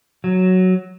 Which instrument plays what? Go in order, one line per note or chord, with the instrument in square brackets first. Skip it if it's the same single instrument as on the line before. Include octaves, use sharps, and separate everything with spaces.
[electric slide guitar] F#3